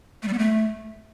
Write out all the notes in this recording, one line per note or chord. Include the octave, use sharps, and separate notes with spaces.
A3
G3
B3
A3